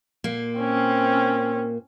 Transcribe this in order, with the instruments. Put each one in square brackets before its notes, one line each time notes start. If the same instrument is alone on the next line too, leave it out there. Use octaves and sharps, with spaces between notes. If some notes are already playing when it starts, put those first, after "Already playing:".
[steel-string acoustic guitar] A#2 A#3
[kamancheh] C4 C#4